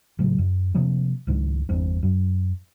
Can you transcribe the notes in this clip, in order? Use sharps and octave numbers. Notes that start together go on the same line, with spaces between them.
A2 C#3 F#3
F#2
C3 F3 A#3
C#2 G#2 D#3
G1 E2 C4
F#2